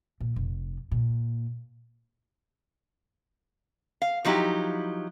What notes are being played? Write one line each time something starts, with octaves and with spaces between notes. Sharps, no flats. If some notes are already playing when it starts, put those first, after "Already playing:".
A#2
F1
A#2
F5
F3 F#3 D#4 E4 G4